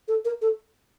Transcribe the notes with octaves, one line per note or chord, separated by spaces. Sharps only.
A4
A#4
A4